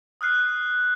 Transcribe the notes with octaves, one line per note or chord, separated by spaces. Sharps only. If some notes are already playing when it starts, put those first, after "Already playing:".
D#6 F6 F#6 C7